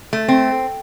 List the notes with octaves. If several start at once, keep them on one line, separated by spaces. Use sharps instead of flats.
A3
C4